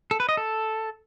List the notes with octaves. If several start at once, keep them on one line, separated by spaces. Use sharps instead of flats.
A4
B4
D#5
A4